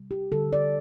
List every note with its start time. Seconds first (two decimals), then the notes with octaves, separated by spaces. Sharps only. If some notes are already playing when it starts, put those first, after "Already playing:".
Already playing: C3 G3
0.11 G4
0.32 D3 G3 A4
0.53 D5